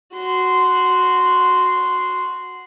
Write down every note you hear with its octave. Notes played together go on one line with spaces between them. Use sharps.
F#4 C6